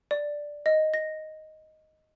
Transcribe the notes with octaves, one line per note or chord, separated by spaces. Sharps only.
D5
D#5
A#6